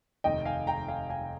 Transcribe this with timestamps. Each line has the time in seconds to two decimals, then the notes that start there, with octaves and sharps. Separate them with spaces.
0.24 F1 D#2 D#3 D#5 G5
0.45 F5 G#5
0.67 G5 A#5
0.88 F5 G#5
1.09 F5 G#5